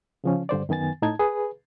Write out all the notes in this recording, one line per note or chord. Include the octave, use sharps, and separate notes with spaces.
C#3 F3 C#4
G2 D3 C5 D5
F#2 D#3 B3 G#5 A6
A2 D#4 A5 G#6
G#4 B4